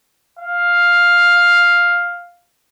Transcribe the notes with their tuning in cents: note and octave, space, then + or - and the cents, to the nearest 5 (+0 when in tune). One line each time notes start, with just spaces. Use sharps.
F5 +5